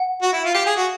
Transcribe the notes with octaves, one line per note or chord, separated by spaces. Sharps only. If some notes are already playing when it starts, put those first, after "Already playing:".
Already playing: F#5
F#4
E4
F4
G4 F5
G#4
F#4